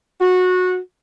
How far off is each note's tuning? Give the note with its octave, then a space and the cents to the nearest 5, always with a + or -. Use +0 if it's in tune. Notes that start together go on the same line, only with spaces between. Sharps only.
F#4 -20